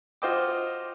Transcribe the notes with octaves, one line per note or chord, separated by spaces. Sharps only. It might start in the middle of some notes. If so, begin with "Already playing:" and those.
F4 F#4 C5 D#5 G5 D6